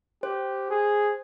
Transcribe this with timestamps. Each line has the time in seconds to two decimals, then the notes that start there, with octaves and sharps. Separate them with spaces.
0.23 G4 C5
0.71 G#4